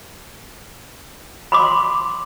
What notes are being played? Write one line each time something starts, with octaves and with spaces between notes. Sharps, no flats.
B5 C6 D6